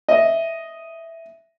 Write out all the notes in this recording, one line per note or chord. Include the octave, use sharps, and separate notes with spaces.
D#5 E5